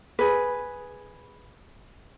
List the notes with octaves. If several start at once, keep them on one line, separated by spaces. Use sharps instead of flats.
G#4 B4